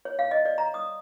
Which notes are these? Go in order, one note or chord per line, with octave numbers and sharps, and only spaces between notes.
C#5
F5
D#5
D5
A#5
D#6